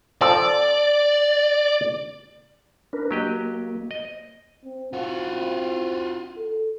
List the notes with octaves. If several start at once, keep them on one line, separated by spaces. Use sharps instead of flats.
F3 C4 A4 D5
D4 A#4 B4
F#3 A#3 G4 D#5
D#5
C4
C4 F4 F#4
A4